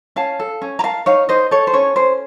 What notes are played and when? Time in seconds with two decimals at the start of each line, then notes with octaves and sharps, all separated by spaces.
0.16 C#4 F5 A5
0.40 A4
0.62 C#4
0.79 A#5
0.83 A#4 F5 A5
1.06 D#4 C#5 F5
1.29 D#4 C5 D#5
1.51 A4 C#5
1.67 C5
1.73 C#4 C#5
1.96 C#4 C5